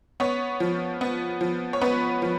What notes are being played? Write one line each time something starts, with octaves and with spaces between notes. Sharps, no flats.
B3 C#5
F3
B3
F3
C#5
B3 B4
F3